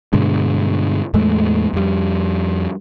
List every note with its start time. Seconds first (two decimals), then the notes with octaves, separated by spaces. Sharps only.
0.13 G2 B2 D3 G#3
1.14 E2 A2 G#3 A3
1.73 F2 G3